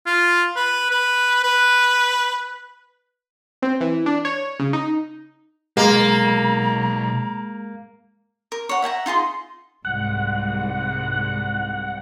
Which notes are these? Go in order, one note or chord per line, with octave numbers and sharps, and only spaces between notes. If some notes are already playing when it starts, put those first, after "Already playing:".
F4
B4
B4
B4
C4
E3
D4
C#5
C#3
D#4
B1 G#3 A#3 A#5
A#4
C#5 F#5
E5 F#5 G#5 A#5
D#4 F4 G#4 C6
C2 G#2 F#5